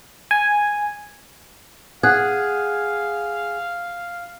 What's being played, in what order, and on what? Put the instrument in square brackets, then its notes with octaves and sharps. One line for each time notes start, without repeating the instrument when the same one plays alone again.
[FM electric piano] G#5
[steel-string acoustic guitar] G#4 [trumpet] F5 [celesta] F#5 F#6 G#6